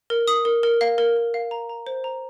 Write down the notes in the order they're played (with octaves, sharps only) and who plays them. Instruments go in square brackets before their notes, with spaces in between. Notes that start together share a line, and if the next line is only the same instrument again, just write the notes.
[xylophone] A#4
D#6
A#4
A#4
F5
A#4
A#4
F5
A#5
A#5
C5
A#5